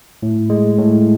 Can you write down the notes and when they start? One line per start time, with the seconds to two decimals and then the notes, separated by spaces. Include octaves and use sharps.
0.23 A2
0.50 G#3
0.78 A2